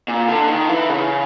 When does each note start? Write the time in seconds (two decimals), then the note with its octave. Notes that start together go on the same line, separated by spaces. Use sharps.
0.08 A#2
0.28 D3
0.48 D#3
0.69 E3
0.89 C#3